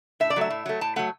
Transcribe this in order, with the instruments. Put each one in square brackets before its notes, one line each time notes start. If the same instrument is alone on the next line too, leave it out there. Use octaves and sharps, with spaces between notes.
[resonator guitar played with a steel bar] A2 E5
D5
F#3 A3 E5
A2
F#3 A3
A2 A5
F#3 A3 F#5